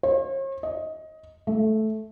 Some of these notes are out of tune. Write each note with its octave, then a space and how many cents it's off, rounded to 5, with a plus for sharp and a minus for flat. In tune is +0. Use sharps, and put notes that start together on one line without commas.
C#5 -45
D#5 +15
A3 -10